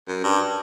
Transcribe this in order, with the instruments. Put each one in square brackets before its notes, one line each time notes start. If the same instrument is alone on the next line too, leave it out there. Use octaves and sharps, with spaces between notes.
[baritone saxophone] F#2
G2